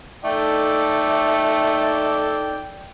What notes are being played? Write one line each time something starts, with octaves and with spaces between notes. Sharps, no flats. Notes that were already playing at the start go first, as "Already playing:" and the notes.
A3 D#4 A4 D5 G5